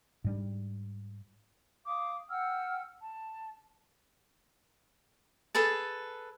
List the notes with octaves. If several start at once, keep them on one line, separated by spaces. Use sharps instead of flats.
G#2 G3 D4
F5 D6 D#6
F#5 G5 E6 F6
A5
G#4 A4 B4 A5